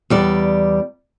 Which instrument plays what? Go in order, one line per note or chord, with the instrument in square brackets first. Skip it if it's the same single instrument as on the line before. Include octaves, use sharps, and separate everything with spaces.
[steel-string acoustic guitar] E2 G3 D5